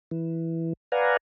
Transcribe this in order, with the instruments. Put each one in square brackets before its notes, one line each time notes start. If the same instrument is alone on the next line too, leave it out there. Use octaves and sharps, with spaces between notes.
[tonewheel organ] E3
B4 D5 F5 F#5 G#5 A#5